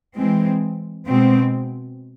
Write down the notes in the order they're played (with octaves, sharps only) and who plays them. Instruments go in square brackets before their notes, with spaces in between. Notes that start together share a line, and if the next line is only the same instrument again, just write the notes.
[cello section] E3 G#3 C4
B2 G#3 C4